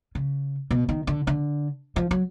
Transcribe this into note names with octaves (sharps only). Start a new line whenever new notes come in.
C#3
B2
D#3
D3
D3
F3
F#3